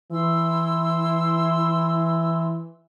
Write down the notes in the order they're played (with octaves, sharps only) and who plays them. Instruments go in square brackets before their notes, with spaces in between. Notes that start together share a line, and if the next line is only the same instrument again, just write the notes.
[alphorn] E3 [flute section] E4 C6 E6